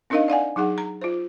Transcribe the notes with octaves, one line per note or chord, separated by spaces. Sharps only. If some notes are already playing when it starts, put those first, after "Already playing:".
C4 D4 D#4 A#4 D#5 F5
D5 F5 F#5 G#5
F#3 D#4 G#4 F#5
A#5
F4 C5